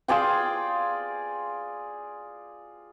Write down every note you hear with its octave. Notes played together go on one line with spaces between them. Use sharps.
F4 G#4 D5 G5